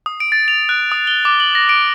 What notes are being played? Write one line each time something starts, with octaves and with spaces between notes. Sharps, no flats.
D#6
D7
A6
F7
F#6
D#6
G7
D6
F#7
A#6
D7